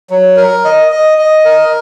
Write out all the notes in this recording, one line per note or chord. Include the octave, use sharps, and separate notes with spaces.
F#3
A#4
D#5
D#5
D#5
A#4